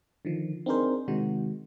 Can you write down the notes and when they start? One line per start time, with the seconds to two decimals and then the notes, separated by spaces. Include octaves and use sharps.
0.25 D3 D#3 F3
0.66 C4 D4 D#4 G#4 A#4 C5
1.08 C3 D#3 G#3 F#4